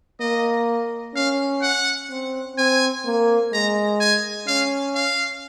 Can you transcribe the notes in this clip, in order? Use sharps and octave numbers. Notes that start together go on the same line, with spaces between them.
A#3 D#5
C#4 F5
F#5
C4
C4 G#5
A#3
G#3 A#5
G#5
C#4 F5
F5